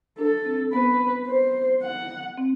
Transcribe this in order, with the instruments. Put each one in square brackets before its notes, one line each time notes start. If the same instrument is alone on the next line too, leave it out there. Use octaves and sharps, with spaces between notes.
[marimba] D4 [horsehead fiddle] A4
[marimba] C4
[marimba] B3 [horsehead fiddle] B4
[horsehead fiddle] C5
F#5
[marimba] C4